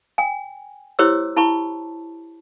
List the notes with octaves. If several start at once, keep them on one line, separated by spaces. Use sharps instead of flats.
G5 G#5
E4 G4 C5 C#5 D6 E6
E4 A5 B5 C#6